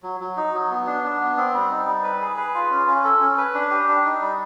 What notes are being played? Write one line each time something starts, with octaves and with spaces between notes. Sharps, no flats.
F#3
F#3
D#4
F#3
B3
D4
D4
B3
C4
G3
D#4
G3
B4
G#4
B4
F4
C#4
C#4
A4
C#4
B4
D4
G4
D4
D#4
G3